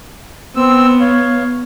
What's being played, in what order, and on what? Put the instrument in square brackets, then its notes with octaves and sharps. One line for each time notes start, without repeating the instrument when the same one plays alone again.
[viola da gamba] B3 [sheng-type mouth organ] C4 E6
[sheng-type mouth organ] C#5 F5